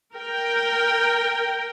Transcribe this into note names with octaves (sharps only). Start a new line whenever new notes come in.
A#4 G5